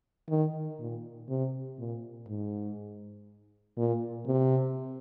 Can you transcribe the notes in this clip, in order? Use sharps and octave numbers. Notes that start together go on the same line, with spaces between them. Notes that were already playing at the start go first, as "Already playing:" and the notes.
D#3
A#2
C3
A#2
G#2
A#2
C3